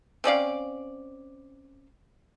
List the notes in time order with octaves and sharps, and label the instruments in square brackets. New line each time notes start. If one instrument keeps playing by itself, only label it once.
[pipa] C4 C#4 D5 F5